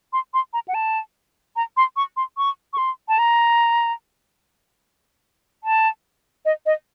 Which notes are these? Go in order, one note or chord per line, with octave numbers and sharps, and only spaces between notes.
C6
C6
A#5
F#5
A5
A#5
C6
C#6
C6
C#6
C#6
C6
A5
A#5
A5
D#5
D#5